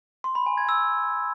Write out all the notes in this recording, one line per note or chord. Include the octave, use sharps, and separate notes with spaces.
C6
B5
G#5
G#6
E6